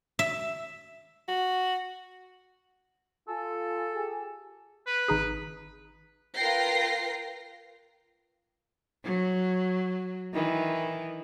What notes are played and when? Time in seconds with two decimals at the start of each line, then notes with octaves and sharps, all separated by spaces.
0.19 E5
1.28 F#4
3.28 F4 A4 G#5
3.93 G4 G#4
4.86 B4
5.08 G#1 D#4 G#4
6.36 F4 A#4 B4 G5 A#6 C7
9.04 F#3
10.33 D#3 E3